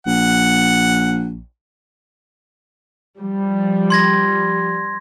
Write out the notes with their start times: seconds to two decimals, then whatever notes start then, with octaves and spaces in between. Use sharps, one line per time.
0.07 A#1 F#5
3.20 F3 G3
3.90 C6 G#6 A#6